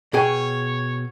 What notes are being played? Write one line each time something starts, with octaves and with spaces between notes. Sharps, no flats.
B2 G#4 C#5 G5